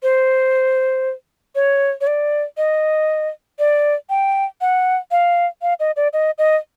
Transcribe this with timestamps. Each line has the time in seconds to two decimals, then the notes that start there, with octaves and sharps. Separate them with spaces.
0.03 C5
1.55 C#5
2.01 C#5
2.07 D5
2.57 D#5
3.59 D5
4.10 G5
4.61 F#5
5.11 F5
5.62 F5
5.80 D#5
5.96 D5
6.13 D#5
6.38 D#5